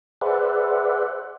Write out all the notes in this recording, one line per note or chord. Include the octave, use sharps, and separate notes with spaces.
G#4 B4 C5 D5 E5 F#5